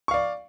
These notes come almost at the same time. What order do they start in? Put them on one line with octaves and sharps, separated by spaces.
C#6 F5 D5